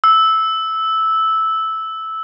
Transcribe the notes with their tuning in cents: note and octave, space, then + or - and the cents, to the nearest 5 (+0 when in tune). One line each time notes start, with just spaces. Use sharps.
E6 -10